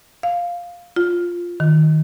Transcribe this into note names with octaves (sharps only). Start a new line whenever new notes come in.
F5
F4
D#3